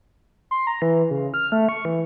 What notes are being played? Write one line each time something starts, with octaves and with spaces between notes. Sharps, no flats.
C6
A#5
E3
C#3
F6
A3
C#6
E3